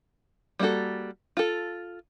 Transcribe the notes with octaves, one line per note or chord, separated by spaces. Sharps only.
G3 A#3 F4 F#4 A4
F4 A4